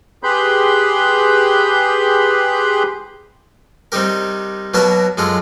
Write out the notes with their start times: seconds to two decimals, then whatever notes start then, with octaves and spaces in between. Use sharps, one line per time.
0.23 G4 G#4 B4 B5 C6 G6
3.92 C3 G3 D#4 G4 A#4
4.74 B2 F#3 A#3 A#4 A5 B5
5.18 F#2 G#3 F4 A4